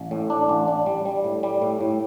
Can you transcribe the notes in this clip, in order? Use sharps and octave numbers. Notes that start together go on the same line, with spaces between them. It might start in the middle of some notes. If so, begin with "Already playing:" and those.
Already playing: A1
A2
D4
A1
D4
G3
G3
A2
G3
A2
A2